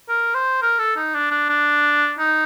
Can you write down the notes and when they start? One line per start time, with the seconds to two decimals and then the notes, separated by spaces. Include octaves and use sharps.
0.09 A#4
0.34 C5
0.62 A#4
0.78 A4
0.96 D#4
1.14 D4
1.31 D4
1.49 D4
2.19 D#4